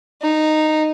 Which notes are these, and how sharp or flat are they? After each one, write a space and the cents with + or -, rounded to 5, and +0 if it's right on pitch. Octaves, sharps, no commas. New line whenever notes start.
D#4 -10